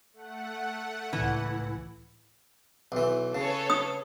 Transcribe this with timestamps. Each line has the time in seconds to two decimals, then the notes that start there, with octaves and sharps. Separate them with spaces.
0.13 A3 F#5
1.13 C#2 A2 E3
2.92 B1 E3
3.35 C#3 A4 B4 C#5
3.70 D#6